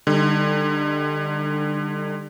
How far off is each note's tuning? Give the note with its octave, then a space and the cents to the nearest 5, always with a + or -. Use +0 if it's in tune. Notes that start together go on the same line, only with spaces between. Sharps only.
D3 +25 G3 +25 D#4 +0